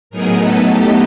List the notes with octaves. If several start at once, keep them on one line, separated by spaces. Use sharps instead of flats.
A2 F#3 B3 D#4 G#4 A#4
A4 B4
G4 A4